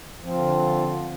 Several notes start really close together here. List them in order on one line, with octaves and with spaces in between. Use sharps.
F3 C4 F4 D3